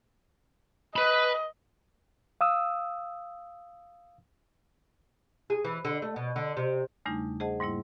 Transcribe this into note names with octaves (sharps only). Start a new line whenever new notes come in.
B4 D#5 B5
F5 D#6 E6
G#4
E3
D3
A3
B2
D3
C3
E2 C#3 G3 A3 D4 D#4
G#4 C5 D#5 F#5 A5
G#2 G3 A#3 E4